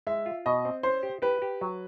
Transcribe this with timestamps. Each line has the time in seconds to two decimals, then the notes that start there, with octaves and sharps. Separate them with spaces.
0.07 G#3 E5
0.26 F4
0.46 B2 D#5
0.65 C4
0.83 C#4 C5
1.03 G4
1.22 G4 B4
1.42 G4
1.61 F#3